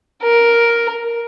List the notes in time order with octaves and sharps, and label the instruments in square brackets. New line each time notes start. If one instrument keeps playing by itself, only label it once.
[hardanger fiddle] A#4